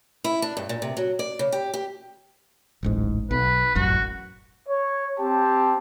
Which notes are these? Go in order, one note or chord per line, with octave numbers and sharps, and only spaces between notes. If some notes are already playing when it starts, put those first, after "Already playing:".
E4
D4
G2
A#2
C3
F#3
D5
C#3
G4
G4
D1 A1 G#2
B1 B4
E1 A1 F#2 F#4
C#5
C4 G4 A5